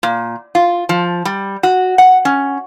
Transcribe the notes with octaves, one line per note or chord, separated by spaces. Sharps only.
A#2
F4
F3
G3
F#4
F#5
C#4